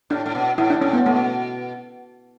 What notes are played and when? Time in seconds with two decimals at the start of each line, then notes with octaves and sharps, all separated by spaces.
0.10 A2 D4
0.26 A2
0.35 B2
0.58 A2 E4
0.70 D4
0.81 A2 C#4
0.93 B3
1.06 B2 A3